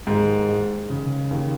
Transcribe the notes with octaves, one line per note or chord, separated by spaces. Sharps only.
D#2 G#2
G#3
C#3
D#2